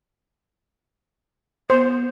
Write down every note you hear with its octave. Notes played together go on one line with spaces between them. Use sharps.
B3 C5